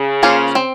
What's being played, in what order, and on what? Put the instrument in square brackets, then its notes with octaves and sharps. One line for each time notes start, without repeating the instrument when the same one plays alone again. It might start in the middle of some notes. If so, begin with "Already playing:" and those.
Already playing: [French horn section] C#3
[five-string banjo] A#3 C#4 F4 C5
C4